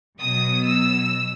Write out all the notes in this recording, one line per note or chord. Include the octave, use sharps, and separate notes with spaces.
B2 F#3 D#6
E6